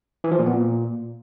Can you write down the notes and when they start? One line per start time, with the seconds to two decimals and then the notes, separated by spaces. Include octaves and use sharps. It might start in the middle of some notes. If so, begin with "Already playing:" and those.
0.24 E3
0.32 F3
0.39 A#2
0.46 B3
0.54 A#2